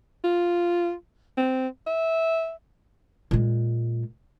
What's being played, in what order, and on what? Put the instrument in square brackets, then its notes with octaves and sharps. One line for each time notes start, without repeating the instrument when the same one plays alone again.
[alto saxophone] F4
C4
E5
[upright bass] A#2 G#3